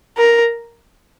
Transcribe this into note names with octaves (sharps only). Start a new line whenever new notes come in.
A#4